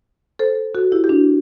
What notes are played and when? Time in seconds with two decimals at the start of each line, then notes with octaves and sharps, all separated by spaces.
0.39 A4 C5
0.75 F#4 A4
0.92 E4 G4
1.04 G4
1.09 D4 F#4